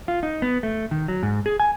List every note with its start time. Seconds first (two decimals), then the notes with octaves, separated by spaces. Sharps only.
0.08 F4
0.23 D#4
0.42 B3
0.63 A3
0.91 D#3
1.08 F#3
1.23 G#2
1.46 G#4
1.60 G#5